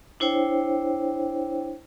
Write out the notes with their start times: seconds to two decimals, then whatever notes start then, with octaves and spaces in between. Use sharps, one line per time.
0.20 D4 E4 C5 C#5 G5